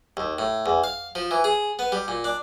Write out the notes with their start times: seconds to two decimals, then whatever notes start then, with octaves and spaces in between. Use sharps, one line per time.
0.17 D#2
0.39 A2
0.66 E2
0.84 F5
1.15 F3
1.31 E3
1.44 G#4
1.79 B3
1.92 G3
2.08 A#2
2.24 D4